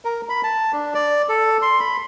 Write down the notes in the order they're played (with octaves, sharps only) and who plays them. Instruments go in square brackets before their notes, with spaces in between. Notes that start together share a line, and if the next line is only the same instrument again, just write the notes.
[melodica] A#4
B5
A5
D4
D5
A4
C6
B5